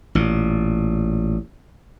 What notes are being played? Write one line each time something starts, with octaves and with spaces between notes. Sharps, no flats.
A1 A#2